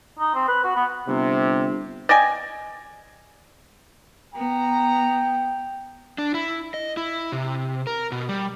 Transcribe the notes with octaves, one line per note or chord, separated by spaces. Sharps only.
D#4
C4
B4
F#4
B3
G1 C3
D5 D#5 G5 G#5
B3 G5 A#5
D4
E4
D#5
E4
C3
A#4
B2
G3